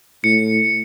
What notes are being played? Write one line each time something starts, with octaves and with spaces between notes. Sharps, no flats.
A2 C#7